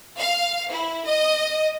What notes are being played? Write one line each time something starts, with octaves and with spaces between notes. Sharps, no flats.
F5
E4
D#5